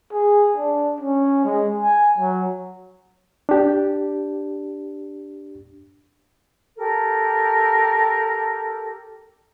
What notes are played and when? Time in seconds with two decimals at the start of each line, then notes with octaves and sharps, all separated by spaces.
0.13 G#4
0.57 D4
1.01 C#4
1.45 G#3
1.80 G#5
2.18 F#3
3.49 D4 G4
6.77 G4 A4 A#4